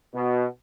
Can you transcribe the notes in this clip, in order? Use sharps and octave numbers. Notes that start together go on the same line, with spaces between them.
B2